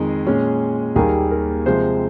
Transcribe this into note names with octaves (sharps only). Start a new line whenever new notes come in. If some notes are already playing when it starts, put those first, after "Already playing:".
Already playing: F2 D#3 G#3 G#4
A#2 G#3 C#4
D#2 D#3 G3 A#3 G#4
A#4
C3 F3 G#3 C5